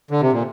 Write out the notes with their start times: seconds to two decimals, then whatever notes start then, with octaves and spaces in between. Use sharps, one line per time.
0.11 D3
0.21 C3
0.32 A#2